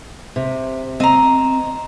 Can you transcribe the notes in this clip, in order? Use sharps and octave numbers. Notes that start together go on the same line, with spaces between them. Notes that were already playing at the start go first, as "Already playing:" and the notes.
C3
C4 D#5 A#5